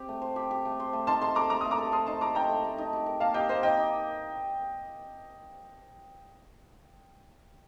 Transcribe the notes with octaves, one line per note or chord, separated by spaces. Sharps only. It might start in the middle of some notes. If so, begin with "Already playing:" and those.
Already playing: C4 G4
A3
C5
G4
G4
A3
C5
A3
D#4 A5 C6
A4 A5 C6
A4 A#5 D6
A3 A#5 D6
A3 D#6
A#5 D6
A4
A4 C6 D#6
D#4 A5 C6
A4 A#5 D6
D#4 G5 A#5
A3
A3
D#4
G4
A#4
A#3 F5 A5
G4 D#5 G5
A#3 C5 D#5
D#4 D#5 G5
D#4